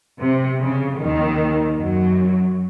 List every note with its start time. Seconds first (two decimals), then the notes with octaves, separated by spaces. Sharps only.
0.21 C3
0.61 C#3
0.99 D#2 D#3
1.77 F#2 F#3